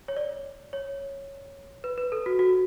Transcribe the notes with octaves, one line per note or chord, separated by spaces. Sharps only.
C#5
D5
C#5
B4
B4
A4
F#4
F#4